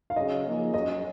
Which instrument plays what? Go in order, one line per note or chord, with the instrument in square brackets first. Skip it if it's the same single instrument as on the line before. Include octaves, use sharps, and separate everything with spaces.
[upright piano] F5
[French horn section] C#3 F#3 C#4 G#4 [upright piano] D#5
[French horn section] F3 A#3 D#4 G#4
[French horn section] F#3 C#4 G#4 [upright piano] D#5